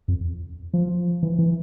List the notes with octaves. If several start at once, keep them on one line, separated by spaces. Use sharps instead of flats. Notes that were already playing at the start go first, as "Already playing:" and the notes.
F2
F3
E3
E3